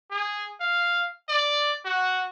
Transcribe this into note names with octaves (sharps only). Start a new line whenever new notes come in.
G#4
F5
D5
F#4